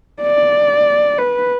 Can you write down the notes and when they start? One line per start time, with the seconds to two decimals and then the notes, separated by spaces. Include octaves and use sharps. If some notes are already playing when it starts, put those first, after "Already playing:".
0.22 D5
1.18 B4